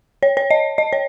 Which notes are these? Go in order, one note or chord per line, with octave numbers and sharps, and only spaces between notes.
C#5
C#5
D#5
D#5
C#5